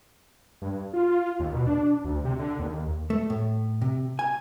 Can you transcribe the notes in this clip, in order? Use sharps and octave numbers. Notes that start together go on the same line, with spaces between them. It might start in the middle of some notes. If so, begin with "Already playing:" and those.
G2
F4
D#2
B2
D4
D2
C3
D3
D#2
A3
A2
C3
G#5